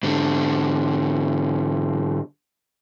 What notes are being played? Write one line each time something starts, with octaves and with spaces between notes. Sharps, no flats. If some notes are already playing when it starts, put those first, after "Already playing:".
G#2 D3